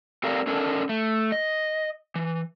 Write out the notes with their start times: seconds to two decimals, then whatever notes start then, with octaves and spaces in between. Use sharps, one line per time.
0.23 C4 G4 A4 A#4 D5 F5
0.47 C#4 D4 A4 A#4
0.89 A3
1.32 D#5
2.15 E3